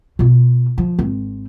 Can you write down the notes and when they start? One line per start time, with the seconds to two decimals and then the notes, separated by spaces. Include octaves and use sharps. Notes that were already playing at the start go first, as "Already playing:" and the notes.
0.19 B2 F4
0.78 F3
0.99 G#1 C4